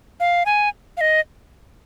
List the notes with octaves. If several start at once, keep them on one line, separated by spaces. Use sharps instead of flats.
F5
G#5
F5
D#5